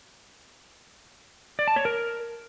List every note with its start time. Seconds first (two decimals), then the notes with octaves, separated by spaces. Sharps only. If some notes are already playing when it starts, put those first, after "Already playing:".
1.59 D5
1.68 A5
1.76 C#5
1.85 A#4